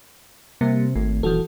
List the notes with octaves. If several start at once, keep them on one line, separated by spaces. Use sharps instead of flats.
C3 G3 A#3
G#1 A3
D#1 E3 F#4 A4